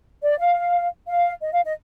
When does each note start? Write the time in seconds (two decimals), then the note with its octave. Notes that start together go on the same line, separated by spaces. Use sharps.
0.23 D5
0.39 F5
1.08 F5
1.42 D#5
1.53 F5
1.64 D#5